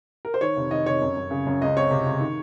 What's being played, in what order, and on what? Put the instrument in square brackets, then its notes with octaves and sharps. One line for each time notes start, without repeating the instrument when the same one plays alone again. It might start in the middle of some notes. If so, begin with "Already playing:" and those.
[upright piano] A#4
C5
D#3 C#5
F1
D#3 D#5
F1 C#5
F#2
F#2
C#3
F#2
C#2 D#5
C4 C#5
C3
C#2
D#3